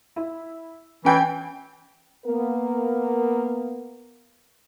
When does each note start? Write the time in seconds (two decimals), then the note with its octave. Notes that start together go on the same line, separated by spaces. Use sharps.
0.16 E4
1.05 E3 C#4 G5 G#5
2.25 A#3 B3 A#4